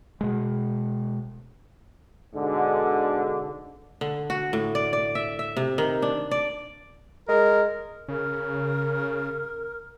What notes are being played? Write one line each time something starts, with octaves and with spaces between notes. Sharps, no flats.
B2 G#3
G#2 B2 D3
D3
F#4
A2
D5
D5
E5
E5
C3
D#3
D4
D5
G#3 A#4
C#3 A#4